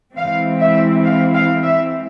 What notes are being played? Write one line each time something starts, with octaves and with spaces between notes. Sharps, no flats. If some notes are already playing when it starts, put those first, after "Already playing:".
E3 G#3 C4 E4 F5
E5
F5
F5
E5